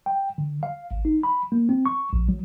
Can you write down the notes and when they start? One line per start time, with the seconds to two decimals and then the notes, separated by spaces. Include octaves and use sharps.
0.06 G5
0.38 D3
0.63 F5
0.91 G#1
1.05 D#4
1.23 B5
1.52 A#3
1.69 C4
1.86 C#6
2.13 A#1
2.29 F#3